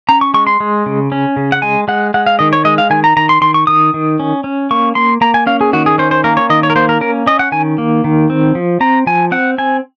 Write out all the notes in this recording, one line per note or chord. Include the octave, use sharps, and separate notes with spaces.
C#4 A#5
C#6
G#3 C#6
C6
G#3
C#3
C#4
C#3
F#5
G#3 G#5
G#3 F#5
G#3 F#5
F5
D#3 D#5
C#5
G#3 D#5
F5
D#3 G#5
A#5
D#3 A#5
C6
D#3 C6
C#6
D#3 D#6
D#3
C#4
C#4
A#3 C#6
A#3 C6
A#3 A#5
G#5
C#4 F5
G#4
D#3 F#4
G#4
C#4 C5
C5
A#3 A#4
C#5
D#3 D#5
C#5
A#4
A#3 C5
A#4
C#4 A#4
C#4 D#5
F#5
D#3 G#5
A#3
D#3
C4
F3
C4 A#5
F3 G#5
C4 F#5
C4 G#5